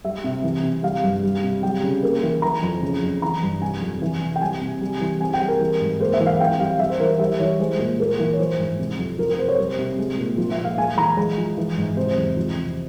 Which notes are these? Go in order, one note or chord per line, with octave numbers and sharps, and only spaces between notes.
G3 E5
C3
E3
C3
G3 F5
G2
G3
C3
G3 G5
C#3
A#3
E3
E3 A#5
F2
C#3
F2
E3 A#5
G2
C3 G#5
F2
E3
C3
G5
G3 G#5
C3
G3
E3
C4 G#5
G5
G3
A#4
E3
G#2
A#3 C5
E5
E3
F5
C4 G5
G3 F5
G3 E5
C5
E3 A#4
C5
G3 E5
E3 C#5
G#3 C5
A#2
A#3
E3
C#5
F3 C5
G#2
C3
F2
F3 A#4
A#4
C3 C5
C#5
G3 C5
C3
G#3
A#2
F3
E5
A#2
F5
G#3 G#5
E3 A#5
G#3
F3
E3
G#2
C3 C5
E2
F3
C3